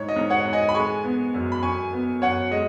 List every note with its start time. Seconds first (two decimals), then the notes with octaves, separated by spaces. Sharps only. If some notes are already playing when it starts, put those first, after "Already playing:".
Already playing: G#2 C#5
0.08 D#5
0.16 G#2
0.30 C#5 F#5
0.45 G#2
0.53 D#5 G#5
0.69 B5
0.74 G#3 G#5 C#6
1.04 B3
1.34 F#2
1.52 B5
1.63 F#2 G#5 C#6
1.93 B3
2.22 F#2 C#5 F#5
2.51 G#3 D#5